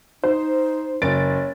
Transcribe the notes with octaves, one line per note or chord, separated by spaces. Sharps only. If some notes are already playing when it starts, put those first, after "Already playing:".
D#4 C5
F#1 C#5 A6 D7